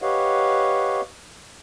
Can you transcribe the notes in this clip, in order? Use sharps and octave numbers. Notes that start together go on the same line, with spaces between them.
G4 B4 C#5 D#5 F5 F#5